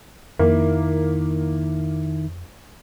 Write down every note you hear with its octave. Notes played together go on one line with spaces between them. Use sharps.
F2 D#3 A#3 E4